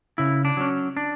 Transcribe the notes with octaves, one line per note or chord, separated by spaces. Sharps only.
C#3 E4
D4
F#3 C#4
D4